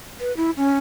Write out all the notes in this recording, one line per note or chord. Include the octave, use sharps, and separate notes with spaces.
B4
E4
C#4